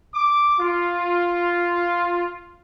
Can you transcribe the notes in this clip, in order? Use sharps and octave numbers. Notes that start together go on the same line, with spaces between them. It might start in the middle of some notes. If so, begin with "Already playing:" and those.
D6
F4